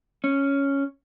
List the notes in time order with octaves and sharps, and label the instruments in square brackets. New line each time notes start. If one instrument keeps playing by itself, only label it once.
[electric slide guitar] C#4